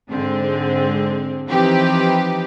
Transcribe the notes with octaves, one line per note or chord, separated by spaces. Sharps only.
G#2 D3 G#3 C4
E3 F3 C4 D#4 G4 B4